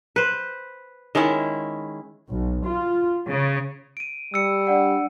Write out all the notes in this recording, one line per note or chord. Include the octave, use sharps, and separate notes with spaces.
B4 C5
D#3 G#3 C#4 E4
B1
F4
C#3
D7 D#7
G3 E6 C#7
D4 D5 F#5